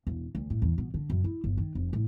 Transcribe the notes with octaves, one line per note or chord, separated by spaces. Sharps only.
E1
D2
A2
E2
B2
D3
F#2
E4
G1
D#3
F1
A2